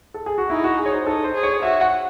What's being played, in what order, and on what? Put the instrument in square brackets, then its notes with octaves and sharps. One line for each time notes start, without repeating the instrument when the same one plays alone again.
[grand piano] A4
G#4
F#4
[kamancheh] D#4 [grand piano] E4
[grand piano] F#4
G#4
C#5
C5
[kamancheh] D#4 [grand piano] A4
[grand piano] C5
[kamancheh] G#4
[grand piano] C#5
[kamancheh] F#4 [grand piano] E5
[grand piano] F#5